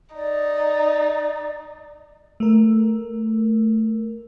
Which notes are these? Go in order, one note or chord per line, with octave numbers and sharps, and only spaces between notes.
D#4 D5
A3 A#4